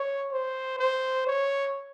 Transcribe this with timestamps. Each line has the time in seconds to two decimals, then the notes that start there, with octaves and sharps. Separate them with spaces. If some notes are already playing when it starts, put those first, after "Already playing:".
Already playing: C#5
0.32 C5
0.79 C5
1.26 C#5